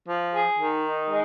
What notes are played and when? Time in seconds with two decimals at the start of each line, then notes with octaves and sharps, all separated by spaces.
0.09 F3
0.34 G#4
0.59 D#3
0.83 D#4
1.09 G#3